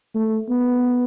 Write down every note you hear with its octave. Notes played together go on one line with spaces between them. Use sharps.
A3
B3